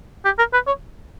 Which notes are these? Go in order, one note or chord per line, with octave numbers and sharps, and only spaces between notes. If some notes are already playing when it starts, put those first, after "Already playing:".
G4
A#4
B4
C#5